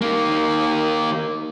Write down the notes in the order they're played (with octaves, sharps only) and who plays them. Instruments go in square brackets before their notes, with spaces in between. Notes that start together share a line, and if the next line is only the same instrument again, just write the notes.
[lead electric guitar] D#3 A#3